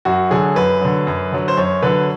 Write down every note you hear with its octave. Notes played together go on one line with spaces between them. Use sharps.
F#2 F#4
D3 F#3 G#4
F#2 B4
D3 F#3
F#2
D3 F#3
C5
F#2 C#5
D3 F#3 B4